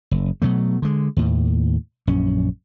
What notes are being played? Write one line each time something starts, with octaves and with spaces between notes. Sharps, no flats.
F#1
B2 F#3 A3
D3 G#3
D#2 A2
A#1 F#2 C#4